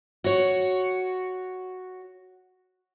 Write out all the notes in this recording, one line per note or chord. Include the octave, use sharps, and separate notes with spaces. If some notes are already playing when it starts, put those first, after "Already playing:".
F#4 C#5